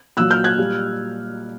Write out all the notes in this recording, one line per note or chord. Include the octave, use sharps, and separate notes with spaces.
A#2 F#3 E6 F#6
F6 G6
F#6 G#6
A#2 G3